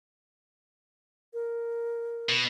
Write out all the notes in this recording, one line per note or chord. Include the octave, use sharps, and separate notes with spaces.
A#4
B2